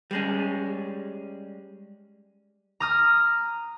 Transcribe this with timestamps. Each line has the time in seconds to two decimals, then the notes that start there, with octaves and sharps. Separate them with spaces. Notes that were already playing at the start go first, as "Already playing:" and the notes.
0.11 G3 G#3 C#4
2.80 A#5 D#6 F6